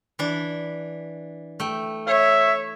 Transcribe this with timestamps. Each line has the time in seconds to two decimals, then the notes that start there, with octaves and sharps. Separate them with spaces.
0.19 E3 D4
1.60 A3 G5
2.08 C#5 E5